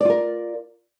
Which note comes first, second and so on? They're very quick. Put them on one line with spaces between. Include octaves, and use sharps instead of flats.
D5 F4 A#4